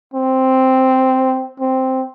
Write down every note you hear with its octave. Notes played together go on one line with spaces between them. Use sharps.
C4
C4